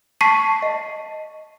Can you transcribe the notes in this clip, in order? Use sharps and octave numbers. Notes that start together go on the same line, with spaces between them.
A5 C#6 B6 C7 D#7
D#5